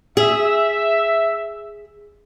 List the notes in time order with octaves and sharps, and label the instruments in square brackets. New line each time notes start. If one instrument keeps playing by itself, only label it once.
[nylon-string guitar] G#4 [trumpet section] E5